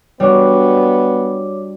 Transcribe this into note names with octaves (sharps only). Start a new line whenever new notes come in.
G3 B3 D4 F#4 C#5 D6